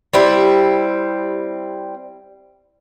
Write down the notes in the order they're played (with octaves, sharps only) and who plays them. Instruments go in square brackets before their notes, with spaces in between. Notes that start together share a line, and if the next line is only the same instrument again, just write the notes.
[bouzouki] G3 C4 E4